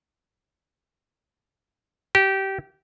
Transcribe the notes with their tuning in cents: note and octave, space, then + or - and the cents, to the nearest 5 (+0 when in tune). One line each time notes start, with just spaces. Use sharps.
G4 -20